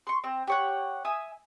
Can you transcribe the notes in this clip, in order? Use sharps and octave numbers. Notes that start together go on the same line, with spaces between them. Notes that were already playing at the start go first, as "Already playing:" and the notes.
C6 C#6
C4
G4 C#5 F#5
E5 G#5 D#6